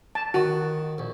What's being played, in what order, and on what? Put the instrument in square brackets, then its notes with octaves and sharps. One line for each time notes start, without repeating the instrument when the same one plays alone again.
[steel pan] A5
[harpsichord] D#3 [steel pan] F#4
[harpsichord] A#1